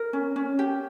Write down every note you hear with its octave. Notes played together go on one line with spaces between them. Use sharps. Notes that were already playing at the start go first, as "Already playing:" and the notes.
Already playing: A#4
C#4
C#4
G4